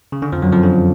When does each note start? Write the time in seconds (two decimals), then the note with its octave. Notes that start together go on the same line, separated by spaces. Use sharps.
0.12 C#3
0.22 D3
0.32 F2 F3
0.42 F#2 F#3
0.53 F2 F3
0.63 D3